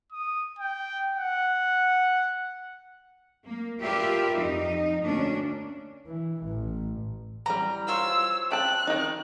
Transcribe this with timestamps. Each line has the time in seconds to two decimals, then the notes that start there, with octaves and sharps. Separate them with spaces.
0.13 D#6
0.59 G5
1.17 F#5
3.45 A#3
3.81 F4 G4 A#4 B4 D5 E5
4.37 F2 D#4
5.02 D2 A#3 C#4 D4
6.07 E3
6.46 A1
7.46 E3 G3 A#5
7.88 F4 C5 C#5 E6
8.52 G5 A5 F#6
8.87 D#3 D#4